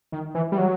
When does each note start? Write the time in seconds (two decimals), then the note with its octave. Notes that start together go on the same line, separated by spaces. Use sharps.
0.12 D#3
0.35 E3
0.52 G3
0.58 F#3